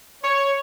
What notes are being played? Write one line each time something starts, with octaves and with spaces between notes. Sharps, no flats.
C#5